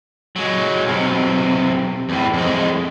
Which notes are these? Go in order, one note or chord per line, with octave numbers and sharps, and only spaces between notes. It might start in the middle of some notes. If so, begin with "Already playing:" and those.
F#3 G#3
B1 C3
E2 A2
F2 G#3